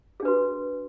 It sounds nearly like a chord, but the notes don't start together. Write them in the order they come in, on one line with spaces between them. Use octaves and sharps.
G#4 D4 B4 F#4